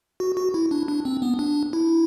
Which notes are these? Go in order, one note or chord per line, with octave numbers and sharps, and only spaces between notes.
F#4
F#4
E4
D4
D4
C4
B3
D4
E4